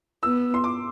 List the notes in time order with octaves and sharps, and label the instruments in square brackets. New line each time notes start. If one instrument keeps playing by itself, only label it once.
[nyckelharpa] B3 [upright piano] E6
[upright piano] C6
D6